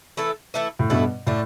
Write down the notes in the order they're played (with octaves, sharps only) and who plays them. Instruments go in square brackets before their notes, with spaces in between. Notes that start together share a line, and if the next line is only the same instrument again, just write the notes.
[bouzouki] E3 A3 E4 A4
E3 A3 E4 A4
[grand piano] A2
[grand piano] G2 B2 [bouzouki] E3 A3 E4 A4
[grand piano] A2 [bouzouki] D3 A3 D4